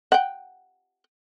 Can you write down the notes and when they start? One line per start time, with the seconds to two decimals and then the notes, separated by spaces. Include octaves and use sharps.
0.12 F#5 G5